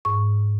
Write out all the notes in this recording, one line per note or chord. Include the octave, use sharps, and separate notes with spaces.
G#2 C#6